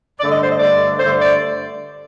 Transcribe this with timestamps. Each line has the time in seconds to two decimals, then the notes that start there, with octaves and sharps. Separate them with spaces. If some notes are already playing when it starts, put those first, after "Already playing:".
0.19 G2 D3 A3 D5
0.30 D#5
0.40 C5
0.50 D#5
0.59 G2 D3 A3 D5
0.99 G2 D3 A3 C5
1.20 D5